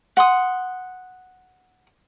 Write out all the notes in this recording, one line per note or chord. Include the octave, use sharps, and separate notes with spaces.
F#5 C6 D#6